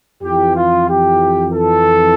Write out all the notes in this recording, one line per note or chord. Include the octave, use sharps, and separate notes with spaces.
F2 E3 G4
F4
G4
A4